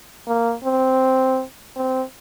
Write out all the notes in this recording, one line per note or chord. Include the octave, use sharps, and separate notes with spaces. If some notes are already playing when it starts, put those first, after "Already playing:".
A#3
C4
C4